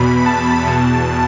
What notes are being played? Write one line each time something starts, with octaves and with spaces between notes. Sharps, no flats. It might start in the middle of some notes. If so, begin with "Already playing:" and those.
Already playing: E2 B2 B5
A5
E2 B2